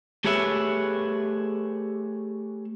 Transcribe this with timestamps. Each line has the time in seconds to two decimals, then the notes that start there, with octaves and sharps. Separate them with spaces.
0.24 A3 G4 G#4 B4 C#5 E5